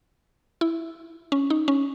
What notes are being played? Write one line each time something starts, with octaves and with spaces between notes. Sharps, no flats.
E4
C#4
D#4
C#4